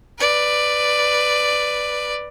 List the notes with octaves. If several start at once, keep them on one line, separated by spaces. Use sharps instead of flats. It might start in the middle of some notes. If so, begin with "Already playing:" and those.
B4 D5